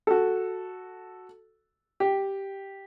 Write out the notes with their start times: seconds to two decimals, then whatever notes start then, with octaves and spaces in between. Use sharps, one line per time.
0.07 F#4 A4
2.00 G4